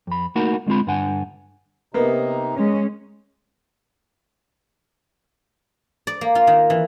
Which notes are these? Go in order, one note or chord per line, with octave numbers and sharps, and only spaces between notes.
F2 B5
A3 A#3 D#4 F#4 A#4 B5
D2 G#3 C4 F4 B5
G2 D3 F#5 G#5
C3 A#3 B3 D#4
G#3 C#4
D5
A#3
F4
D#3
E3